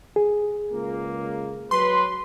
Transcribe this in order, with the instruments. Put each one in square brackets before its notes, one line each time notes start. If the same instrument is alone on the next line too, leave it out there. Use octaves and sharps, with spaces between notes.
[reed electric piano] G#4
[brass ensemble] C#2 A#3
[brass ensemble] F#3 B4 [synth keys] C6